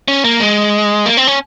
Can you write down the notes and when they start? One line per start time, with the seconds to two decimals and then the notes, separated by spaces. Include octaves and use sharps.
0.08 C#4
0.25 A#3
0.40 G#3
1.06 A#3
1.17 C4
1.27 C#4